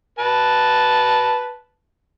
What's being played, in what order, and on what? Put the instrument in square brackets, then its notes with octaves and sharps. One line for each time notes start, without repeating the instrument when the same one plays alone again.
[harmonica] B4 A5